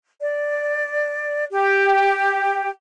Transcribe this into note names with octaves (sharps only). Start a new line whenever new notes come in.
D5
G4 G5